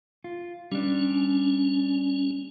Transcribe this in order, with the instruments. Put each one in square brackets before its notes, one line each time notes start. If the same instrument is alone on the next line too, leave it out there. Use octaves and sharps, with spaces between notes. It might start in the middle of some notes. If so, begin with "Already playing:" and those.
[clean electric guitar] F4
[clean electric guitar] G3 D4 [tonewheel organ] C#4